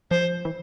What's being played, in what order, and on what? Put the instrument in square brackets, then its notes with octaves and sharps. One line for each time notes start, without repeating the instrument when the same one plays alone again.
[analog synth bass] F3 [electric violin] C5
[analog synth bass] E3